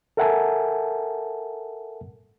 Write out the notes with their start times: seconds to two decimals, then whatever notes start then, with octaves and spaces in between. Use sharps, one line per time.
0.17 A4 A#4 E5 F#5 G#5 A5